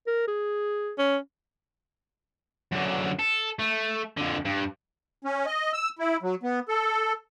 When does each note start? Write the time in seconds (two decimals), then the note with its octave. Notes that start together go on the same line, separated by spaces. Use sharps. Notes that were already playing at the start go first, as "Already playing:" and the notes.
0.07 A#4
0.28 G#4
0.99 C#4
2.72 F#2 D3
3.19 A4
3.59 A3
4.17 F2 D3
4.45 G2
5.25 C#4
5.46 D#5
5.73 E6
5.99 E4
6.23 F#3
6.43 B3
6.69 A4